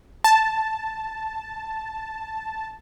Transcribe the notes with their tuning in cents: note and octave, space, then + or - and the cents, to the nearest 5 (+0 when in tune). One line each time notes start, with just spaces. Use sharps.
A5 +0